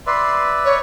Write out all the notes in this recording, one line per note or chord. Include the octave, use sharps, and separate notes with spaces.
B4 D5 E5 C6
C#5